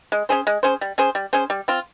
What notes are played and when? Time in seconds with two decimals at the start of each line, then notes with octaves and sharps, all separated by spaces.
0.12 G#3
0.29 C#4 G#4 C5
0.47 G#3
0.63 C#4 G#4 C5
0.81 G3
0.98 C#4 G#4 C5
1.15 G3
1.33 C#4 G#4 C5
1.50 G3
1.68 C4 F4